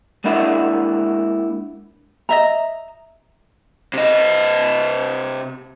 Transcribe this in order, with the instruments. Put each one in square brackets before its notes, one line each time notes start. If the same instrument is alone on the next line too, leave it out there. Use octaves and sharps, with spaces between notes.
[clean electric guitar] G#3 A#3 D4 E4 F#4 E5
[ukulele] D#5 E5 A#5
[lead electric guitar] C3 D#5